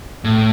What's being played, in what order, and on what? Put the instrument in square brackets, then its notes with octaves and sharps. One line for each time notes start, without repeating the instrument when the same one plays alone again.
[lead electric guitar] A2